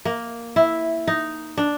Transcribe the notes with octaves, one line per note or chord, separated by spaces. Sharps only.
A#3
E4
D#4
D4